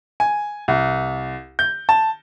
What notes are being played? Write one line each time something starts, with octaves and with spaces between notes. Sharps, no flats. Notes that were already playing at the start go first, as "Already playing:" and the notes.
G#5
C2
G6
A5